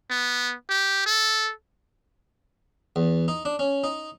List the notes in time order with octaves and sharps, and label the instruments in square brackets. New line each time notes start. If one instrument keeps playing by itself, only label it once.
[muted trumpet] B3
G4
A4
[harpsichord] E2
D#4
D4
C#4
D#4